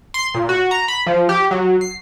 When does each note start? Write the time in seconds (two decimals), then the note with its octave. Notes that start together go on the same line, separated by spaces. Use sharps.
0.14 C6
0.34 A#2
0.49 F#4
0.71 A#5
0.88 B5
1.06 F3
1.29 G4
1.51 F#3
1.81 C7